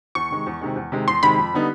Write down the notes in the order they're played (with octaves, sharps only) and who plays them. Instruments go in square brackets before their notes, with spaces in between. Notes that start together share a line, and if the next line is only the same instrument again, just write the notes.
[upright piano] E2 [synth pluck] C#6
[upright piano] C3 D#3 G#3
E2
C3 D#3 G#3
E2
C3 D#3 G#3
[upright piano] E2 [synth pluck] C6
[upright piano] C3 D#3 G#3 [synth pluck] B5
[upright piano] F2
D3 G3 B3 D#4